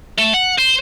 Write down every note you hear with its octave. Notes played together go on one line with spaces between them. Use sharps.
A3
F#5
C5